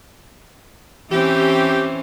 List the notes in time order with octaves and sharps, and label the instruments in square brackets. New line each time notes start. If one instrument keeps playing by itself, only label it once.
[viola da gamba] E3 C4 C#4 [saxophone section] G4